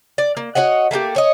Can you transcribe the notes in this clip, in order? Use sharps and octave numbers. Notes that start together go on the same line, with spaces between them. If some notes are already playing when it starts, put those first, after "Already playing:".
D5
A#3
F#4 C#5 D#5 F#5
A3 A#3 F#4 G4
C#5 D#5